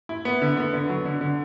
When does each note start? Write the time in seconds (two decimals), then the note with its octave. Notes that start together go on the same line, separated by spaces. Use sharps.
0.09 E4
0.25 B3
0.42 D3
0.57 B3
0.73 D3
0.89 F#3
1.05 D3
1.21 D3